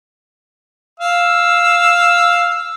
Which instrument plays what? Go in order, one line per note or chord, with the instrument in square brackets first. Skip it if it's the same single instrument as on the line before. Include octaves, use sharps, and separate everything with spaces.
[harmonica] F5 E6